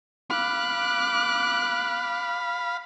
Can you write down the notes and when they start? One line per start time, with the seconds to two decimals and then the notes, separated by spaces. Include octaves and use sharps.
0.30 F5 B5 D6 F#6